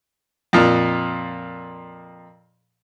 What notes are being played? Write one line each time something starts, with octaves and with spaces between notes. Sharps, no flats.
F2 A#2